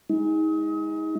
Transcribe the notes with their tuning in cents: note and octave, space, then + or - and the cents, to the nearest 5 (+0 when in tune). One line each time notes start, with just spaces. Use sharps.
G#3 -20 D#4 +35